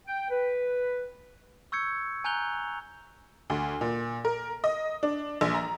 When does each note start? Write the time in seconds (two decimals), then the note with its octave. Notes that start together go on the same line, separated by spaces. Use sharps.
0.07 G5
0.31 B4
1.72 C#6 E6 G6 G#6 C#7
2.24 G#5 A#5 F#6 G6 F7 G7
3.50 D2
3.81 A#2
4.25 A#4
4.64 D#5
5.03 D4
5.41 A#1
5.54 A#5